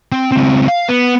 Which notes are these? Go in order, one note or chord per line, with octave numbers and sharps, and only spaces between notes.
C4
C#2 C4
F5
B3